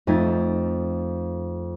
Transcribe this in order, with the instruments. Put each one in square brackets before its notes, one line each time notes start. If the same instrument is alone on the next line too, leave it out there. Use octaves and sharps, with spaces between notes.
[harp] F2 A3 D#4 G#6 A6